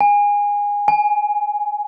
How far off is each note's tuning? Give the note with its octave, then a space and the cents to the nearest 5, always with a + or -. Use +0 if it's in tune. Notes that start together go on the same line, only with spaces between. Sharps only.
G#5 -20
G#5 +15